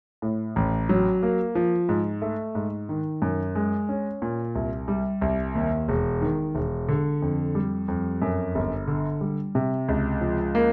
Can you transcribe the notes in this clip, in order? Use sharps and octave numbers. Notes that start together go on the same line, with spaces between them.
A2
A1
F#3
A#3
F3
G#2
A3
G#2
D#3
F#2
G#3
C#4
A#2
C2
G3
C2
D#2
E1
D#3
E1
D3
F2
G3
F2
F#2
G1
D3
G3
C3
C#2
F3
A#3